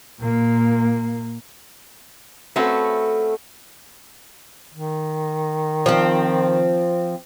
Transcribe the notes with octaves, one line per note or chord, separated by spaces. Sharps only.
A#2 A#3
A3 C4 C#4 F#4 A4 B4
D#3
F3 C4